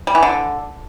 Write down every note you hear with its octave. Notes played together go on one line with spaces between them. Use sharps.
G3
E3
D3